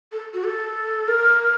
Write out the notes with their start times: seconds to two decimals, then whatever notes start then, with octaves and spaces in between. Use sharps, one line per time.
0.12 A4
0.34 F#4
0.44 A4
1.08 A#4